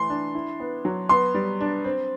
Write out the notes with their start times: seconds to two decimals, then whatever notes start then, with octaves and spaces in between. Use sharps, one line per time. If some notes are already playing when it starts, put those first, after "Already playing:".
Already playing: E3 A3 C6
0.10 D4
0.35 E4
0.60 B3
0.85 F#3
1.09 B3 C6
1.34 G3
1.61 D4
1.84 C4